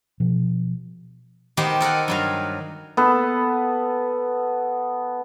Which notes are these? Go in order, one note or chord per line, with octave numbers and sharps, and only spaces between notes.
B2 F3
D#3 B3 G4 C5 A#5
A4 A#4 D#5 F#5
G2 F#3 F5
B3 A4